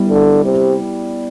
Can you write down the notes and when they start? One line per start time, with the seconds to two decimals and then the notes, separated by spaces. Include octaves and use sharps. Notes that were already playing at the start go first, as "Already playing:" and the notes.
Already playing: G3 B3 E4
0.09 D3
0.45 C3